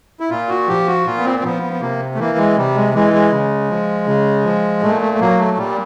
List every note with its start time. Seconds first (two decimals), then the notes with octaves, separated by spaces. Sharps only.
0.20 E4
0.30 A#2 F4
0.49 F#4
0.68 F3 G4
0.87 F#4
1.06 A#2 F4
1.18 B3
1.25 C4
1.39 C4
1.44 F3 B3
1.62 B3
1.73 B3
1.81 C3 A#3
2.15 A3
2.19 E3 A#3
2.38 G#3
2.56 C3 G3
2.75 G#3
2.94 E3 G#3
3.13 G#3
3.32 C#3
3.69 F3
4.07 C#3
4.45 F3
4.82 A#2 A3
5.01 A3
5.14 A3
5.20 F#3 A#3
5.39 A3
5.57 A#2 G3